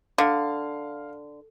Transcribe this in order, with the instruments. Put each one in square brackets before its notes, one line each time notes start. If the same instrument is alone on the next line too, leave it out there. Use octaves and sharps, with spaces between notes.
[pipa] D3 [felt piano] F5